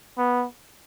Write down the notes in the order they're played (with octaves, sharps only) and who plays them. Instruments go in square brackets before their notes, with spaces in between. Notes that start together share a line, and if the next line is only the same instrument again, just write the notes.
[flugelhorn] B3